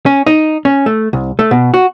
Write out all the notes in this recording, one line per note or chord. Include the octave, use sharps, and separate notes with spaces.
C#4
D#4
C#4
A3
C2
A3
B2
F#4